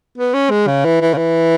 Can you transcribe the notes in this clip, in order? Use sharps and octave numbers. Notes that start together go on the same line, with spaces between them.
B3
C#4
G#3
C#3
E3
E3
C#3
E3